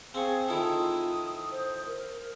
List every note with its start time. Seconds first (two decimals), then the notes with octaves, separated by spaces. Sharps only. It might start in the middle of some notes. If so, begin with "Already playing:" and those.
0.14 C4 G#4 F5 C#6
0.48 D#3 E4 F4 A4 D#6
1.51 C5
1.87 A#4